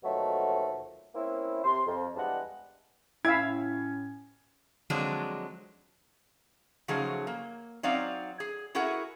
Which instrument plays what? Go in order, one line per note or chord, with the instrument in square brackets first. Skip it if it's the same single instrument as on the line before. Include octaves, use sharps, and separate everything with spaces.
[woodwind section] D#2 B2 F3 F#3 A3
A#3 C4 C#4 E4
C3 C6
F2
E2 G3 G#3 D4 F5 F#5
[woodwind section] A2 C#4 [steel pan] E4 E5 F5 [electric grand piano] G#6
[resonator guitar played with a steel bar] D3 F3 F#3 G#3 C4 D4
C#3 F3 F#3 A3 D#4 G#4
A#3
F#3 C4 D#4 D5 F5
G#4
E4 F#4 G#4 A#4 F#5